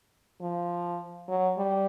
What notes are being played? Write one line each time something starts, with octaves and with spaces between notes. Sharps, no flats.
F3
F#3
G3